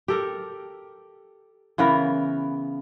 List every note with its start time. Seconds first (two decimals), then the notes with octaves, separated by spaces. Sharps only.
0.08 G4 A4 A#4
1.78 C#3 E3 B3 A#4